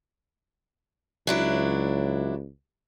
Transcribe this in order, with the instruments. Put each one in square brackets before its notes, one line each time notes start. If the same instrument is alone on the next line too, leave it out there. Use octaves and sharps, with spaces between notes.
[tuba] C#2 [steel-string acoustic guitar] F#3 D4 E4